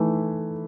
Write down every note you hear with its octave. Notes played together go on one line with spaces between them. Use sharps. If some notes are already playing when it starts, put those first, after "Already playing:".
Already playing: E3 A3 D#4